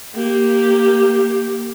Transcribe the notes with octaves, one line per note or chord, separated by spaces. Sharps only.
A#3 G4